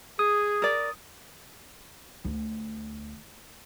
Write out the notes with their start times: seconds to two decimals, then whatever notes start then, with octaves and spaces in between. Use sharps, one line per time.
0.19 G#4 D#6
0.62 A#4 D5
2.25 D2